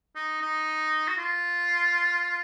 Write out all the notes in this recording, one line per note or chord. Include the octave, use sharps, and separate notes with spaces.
D#4
D#4
F#4
F4